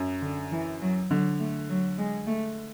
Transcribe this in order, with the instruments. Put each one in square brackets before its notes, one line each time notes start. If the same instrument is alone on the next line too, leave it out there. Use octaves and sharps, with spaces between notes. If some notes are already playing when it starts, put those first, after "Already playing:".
Already playing: [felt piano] F#2
[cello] D3
E3
F#3
[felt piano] D3 [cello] F#3
[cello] A3
F#3
G#3
A3